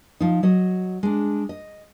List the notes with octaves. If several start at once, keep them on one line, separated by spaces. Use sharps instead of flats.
F3 D#4
F#3 D#5
G#3 D4
D#5